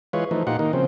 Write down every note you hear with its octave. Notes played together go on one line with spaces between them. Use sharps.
E3 G#3 F4 B4 C#5
E3 F3 A3 D#4
A#2 D#4 F4 G4 F#5
D#3 A#3 D#4
C#3 F3 C4